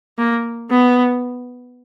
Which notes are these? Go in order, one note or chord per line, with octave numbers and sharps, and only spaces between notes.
A#3
B3